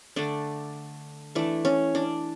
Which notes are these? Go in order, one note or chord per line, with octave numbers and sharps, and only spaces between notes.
D3 A3 D4
E3 A3 D4
C#4
D4